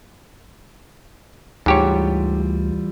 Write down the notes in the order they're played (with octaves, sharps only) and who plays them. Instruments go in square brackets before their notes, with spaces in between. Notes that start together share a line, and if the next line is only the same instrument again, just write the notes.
[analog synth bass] D2 [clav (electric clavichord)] G#2 G4 C#5 [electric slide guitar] E3 G3 F4